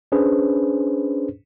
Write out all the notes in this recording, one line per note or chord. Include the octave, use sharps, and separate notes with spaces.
C#4 D4 G#4 B4 C5